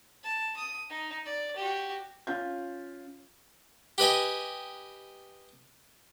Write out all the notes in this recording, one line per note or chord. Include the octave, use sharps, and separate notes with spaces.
A5
D#6
D#4
D5
F#4 G4
C#4 F4 G6
G4 B4 D#5 G#5